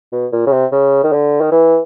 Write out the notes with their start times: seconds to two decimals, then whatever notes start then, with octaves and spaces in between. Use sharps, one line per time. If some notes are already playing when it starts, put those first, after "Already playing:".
0.13 B2
0.32 A#2
0.46 C#3
0.52 C3
0.72 C#3
1.03 D#3
1.12 D3
1.41 D#3
1.52 E3